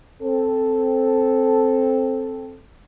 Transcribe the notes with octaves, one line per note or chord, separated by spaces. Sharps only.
C4 A4